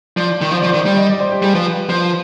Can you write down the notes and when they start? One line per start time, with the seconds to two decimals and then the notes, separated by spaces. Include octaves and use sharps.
0.16 F3 D5
0.41 D#3
0.51 F3 C5
0.60 D5
0.63 F3
0.69 C5
0.74 D#3
0.85 G3 D5
0.97 D#5
1.10 D5
1.20 C5
1.32 G4
1.42 G3 G#4
1.55 F3 B4
1.89 F3 C5